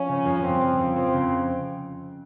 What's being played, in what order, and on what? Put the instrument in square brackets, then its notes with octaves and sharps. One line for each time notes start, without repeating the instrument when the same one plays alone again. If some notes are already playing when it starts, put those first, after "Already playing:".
Already playing: [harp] F3 [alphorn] C#4
[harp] C#3
F2
[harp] F2 [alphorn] C4
[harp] F2
F2
[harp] F2 [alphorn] C4
[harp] C#3